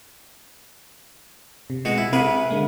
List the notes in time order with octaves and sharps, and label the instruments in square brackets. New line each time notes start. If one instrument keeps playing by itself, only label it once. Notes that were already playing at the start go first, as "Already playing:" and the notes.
[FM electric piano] C3
[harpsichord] B2 G#3 F#4
E4
[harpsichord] C3 G#4 B4 [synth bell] C4 [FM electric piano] B5 F#6
[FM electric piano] D3 G#3 A#3